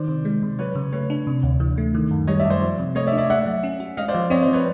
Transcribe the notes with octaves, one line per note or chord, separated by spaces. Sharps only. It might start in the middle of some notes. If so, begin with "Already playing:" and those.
Already playing: D#3 C5 D5
C3
G#3
C3
F#3 B4 C#5
C#3
A3 B4 C#5
D4
C3
D2
E3
A3
D#3
F#2
G3 C#5 D#5
D5 E5
F#2
C5 D5
F3
C3
A3 C#5 D#5
D5 E5
D4
D5 E5
A3 E5 F#5
F#3
C#4
F#4
G#3 D#5 F5
C5 D5
F3
C4 C#5 D#5
C5 D5
F3
B4 C#5